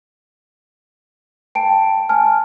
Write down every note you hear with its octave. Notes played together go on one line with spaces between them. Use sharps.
G5 A5 D7
G#5 A5 F6